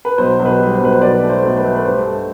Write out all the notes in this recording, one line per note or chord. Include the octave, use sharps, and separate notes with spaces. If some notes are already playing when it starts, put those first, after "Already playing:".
B4
B1 C5
B1
B4
G3
C5
B1 B4
C5
B1 B4 D5
A3
C5
B1
B4
A3
B4
G2 C5
A3